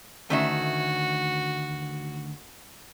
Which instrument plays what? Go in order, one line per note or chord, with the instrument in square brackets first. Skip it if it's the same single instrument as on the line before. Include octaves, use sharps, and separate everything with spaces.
[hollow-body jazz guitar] D2 D#3 [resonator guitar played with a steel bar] A3 C#4 E5 [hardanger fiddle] F#4